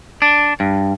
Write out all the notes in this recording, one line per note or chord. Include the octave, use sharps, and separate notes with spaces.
D4
G2